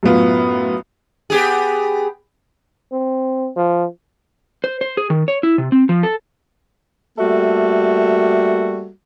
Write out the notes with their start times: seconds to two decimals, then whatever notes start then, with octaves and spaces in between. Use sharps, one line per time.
0.03 F#2 A2 B3 F4
1.30 B3 G4 G#4
2.92 C4
3.56 F3
4.64 C5
4.81 C5
4.97 G#4
5.10 D#3
5.28 C#5
5.43 E4
5.58 C3
5.72 C4
5.89 F3
6.03 A4
7.19 G3 A3 A#3 F#4 A4 E5